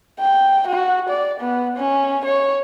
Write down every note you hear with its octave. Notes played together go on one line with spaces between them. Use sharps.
G5
F#4
D5
B3
C#4
C#5